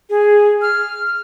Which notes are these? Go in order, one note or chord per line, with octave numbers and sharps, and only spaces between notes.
G#4
F6